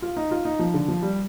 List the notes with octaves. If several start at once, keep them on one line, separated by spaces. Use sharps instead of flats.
F4
D#4
F4
D#4
F3
D3
F3
G3